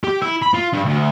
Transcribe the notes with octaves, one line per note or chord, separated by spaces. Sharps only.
G4
E4
B5
F4
G2
D2